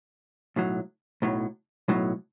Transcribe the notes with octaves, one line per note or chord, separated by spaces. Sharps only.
B1 A2 F#3
B1 A2 F#3
B1 A2 F#3